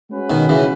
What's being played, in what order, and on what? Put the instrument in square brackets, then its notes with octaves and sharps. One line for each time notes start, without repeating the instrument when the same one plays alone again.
[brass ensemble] G#3 C#4 F#4 B4
[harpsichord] B2 D#3
C#3 E3